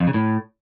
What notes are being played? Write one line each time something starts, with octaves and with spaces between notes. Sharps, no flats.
F2
C#3
A2